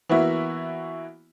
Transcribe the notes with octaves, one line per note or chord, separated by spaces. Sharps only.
E3 A#3 B3 E4 F#4 E5